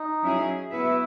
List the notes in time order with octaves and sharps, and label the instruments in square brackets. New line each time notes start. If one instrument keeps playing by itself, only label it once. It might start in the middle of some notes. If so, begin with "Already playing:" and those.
Already playing: [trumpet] D#4
[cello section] F#3 C#4 E4 G#4
[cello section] B3 F#4 B4 E5 [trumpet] E4